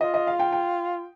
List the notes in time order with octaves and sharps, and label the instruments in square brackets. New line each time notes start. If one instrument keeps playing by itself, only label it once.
[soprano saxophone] F4 [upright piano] D#5
[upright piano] D#5
F5
G5
G5